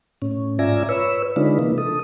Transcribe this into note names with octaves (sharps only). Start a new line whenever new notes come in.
A2 C#4
G#2 F4 D5 E5 G#5 A#5
B4 C#5 E6
D3 G#3 D4 D#4 F4 B4
C3 E3 A#3 D#4
A4 D#6